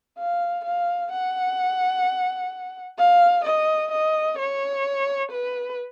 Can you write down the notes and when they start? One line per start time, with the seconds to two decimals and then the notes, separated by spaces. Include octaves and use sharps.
0.18 F5
0.65 F5
1.12 F#5
2.98 F5
3.45 D#5
3.92 D#5
4.38 C#5
5.32 B4